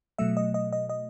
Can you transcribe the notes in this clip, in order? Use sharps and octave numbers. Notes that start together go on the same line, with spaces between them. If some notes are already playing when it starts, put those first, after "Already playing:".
B2 F#3 A3 E5
D#5
D#5
D#5
D#5